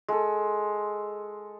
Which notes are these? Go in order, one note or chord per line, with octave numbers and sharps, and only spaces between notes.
G#3 A4